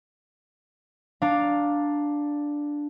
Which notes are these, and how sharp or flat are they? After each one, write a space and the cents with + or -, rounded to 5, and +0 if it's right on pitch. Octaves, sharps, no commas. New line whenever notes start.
D4 +0 F5 +5 A#5 +0